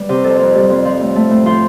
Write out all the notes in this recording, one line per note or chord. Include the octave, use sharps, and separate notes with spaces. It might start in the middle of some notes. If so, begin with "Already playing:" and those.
Already playing: G3 B4
C3
F2 A4
F2
G3
F2
F3
A2
A3
A2
F3 C5